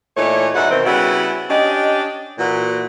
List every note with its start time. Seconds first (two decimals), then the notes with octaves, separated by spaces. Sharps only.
0.16 A#2 E3 A3 D#4 C#5
0.54 E2 G#2 D#4 F#4 E5 F#5
0.70 B2 D#3 C4
0.85 C#3 G3 B3 E4 F#4
1.49 C#4 D4 G4 D#5
2.38 A#2 E3 F#4